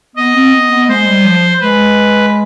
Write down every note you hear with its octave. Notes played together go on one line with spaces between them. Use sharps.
B3 D#5
C4
B3
B3
G#3 C5
G3
F3
G#3 B4